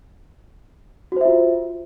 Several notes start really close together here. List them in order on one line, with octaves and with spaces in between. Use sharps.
F#4 C5 E5 F4